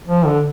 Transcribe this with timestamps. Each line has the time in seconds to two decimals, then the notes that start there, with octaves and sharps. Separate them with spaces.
0.08 F3
0.26 D3